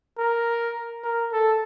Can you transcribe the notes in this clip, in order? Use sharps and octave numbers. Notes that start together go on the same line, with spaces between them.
A#4
A#4
A4